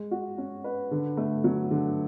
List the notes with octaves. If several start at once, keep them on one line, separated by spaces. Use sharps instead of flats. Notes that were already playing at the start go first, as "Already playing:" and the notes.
Already playing: G#3
F#4
C#4
B4
D3
A3
F#3
D3